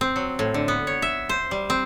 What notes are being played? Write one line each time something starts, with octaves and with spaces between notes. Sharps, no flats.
C4
F#3
A2
D3
B3
C#5
E5
C5
G3
C4